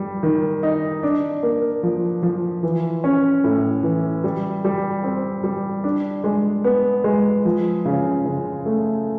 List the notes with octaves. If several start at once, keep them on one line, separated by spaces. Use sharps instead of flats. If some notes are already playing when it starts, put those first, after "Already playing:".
Already playing: G3
D#3
D#4
D4
A#3
F3
F3
E3
C#4
A2
E3
G3
G3
C4
G3
D4
G#3
B3
G#3
F3
C#3
C#3
A3